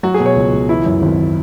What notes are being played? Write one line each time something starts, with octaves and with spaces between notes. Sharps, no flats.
F#3 F#4
G#4
B2
C#5
C#2
C#2
E3 E4
F#2
G#1